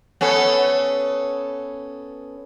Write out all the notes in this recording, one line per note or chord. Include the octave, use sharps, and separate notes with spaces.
B3 C#4 A4